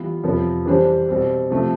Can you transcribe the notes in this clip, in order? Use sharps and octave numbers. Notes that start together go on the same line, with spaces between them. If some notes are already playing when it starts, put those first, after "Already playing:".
Already playing: E3 G3 B3 F4
F2 C3 F3 B3
E3 G3 D4 G4 C5
B2 G3 C4
C3 F3 A3